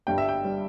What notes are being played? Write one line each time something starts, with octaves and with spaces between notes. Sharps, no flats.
G1 G2 G3 G5
E5
G5
G3